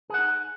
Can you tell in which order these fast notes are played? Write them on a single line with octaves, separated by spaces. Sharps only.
G#4 F#5 D#4